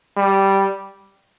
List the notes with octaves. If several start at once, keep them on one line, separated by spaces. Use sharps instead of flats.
G3